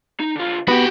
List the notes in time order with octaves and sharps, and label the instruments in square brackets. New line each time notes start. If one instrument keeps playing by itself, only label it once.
[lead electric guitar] D#4
D3 F4
[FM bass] B3 [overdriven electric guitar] F#4 G4 [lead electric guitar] B5